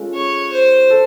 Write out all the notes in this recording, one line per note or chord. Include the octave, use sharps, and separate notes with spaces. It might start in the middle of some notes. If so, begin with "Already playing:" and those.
Already playing: G#3 C#4 F4 A4
C#5
C5
A4